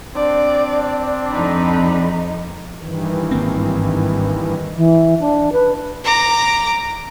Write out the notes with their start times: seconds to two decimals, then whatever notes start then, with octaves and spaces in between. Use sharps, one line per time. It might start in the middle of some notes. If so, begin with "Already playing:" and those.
0.16 C4 D4 D5
1.33 F2 D#4 B5
2.80 G2 D#3 E3
3.31 G#1 A#3 C4
4.76 E3
5.20 D4
5.53 B4
6.04 A#5 D6